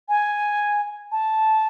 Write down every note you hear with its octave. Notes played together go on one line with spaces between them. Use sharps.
G#5
A5